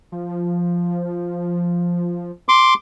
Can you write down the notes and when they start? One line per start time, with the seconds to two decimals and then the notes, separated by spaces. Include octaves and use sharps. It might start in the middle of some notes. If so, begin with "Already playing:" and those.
0.12 F3
2.49 C6 D6